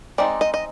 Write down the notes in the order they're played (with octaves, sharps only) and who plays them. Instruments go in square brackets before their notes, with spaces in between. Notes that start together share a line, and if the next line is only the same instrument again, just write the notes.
[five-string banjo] G#3 C4 D#4 D5
D#5
D#5